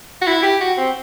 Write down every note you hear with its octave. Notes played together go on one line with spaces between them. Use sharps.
F#4
E4
G4
F#4
C4